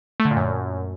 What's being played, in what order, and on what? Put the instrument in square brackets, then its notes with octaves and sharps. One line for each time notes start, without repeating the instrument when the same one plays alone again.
[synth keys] A3
D3
A#2
F#2